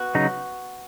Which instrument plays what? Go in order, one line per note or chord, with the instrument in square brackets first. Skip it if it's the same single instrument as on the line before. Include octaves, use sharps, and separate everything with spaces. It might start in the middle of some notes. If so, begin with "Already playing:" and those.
Already playing: [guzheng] B3 F#4
[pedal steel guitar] C#3 F#3 D#4